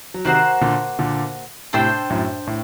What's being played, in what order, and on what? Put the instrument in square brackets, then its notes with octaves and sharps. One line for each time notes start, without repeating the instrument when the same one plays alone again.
[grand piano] F#3
[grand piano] C3 D#3 [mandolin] A#3 F#4 C5 F#5
[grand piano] A#2 D3
A#2 D3
[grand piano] A2 C3 [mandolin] D4 A4 C5 G5
[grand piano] F#2 A2
A2